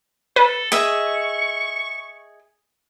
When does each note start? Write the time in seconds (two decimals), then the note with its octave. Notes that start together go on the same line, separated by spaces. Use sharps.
0.36 A4 B4
0.72 G#4 D#5 E5 C#6